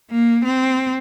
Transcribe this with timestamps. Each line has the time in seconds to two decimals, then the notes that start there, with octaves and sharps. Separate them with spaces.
0.11 A#3
0.45 C4